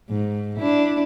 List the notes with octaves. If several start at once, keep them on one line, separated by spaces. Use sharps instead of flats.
G#2
D4 E4